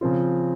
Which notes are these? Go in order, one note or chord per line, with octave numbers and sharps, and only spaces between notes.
C#3 F3 C4 F4